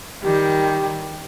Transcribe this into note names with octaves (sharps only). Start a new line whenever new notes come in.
D#3 G3 G4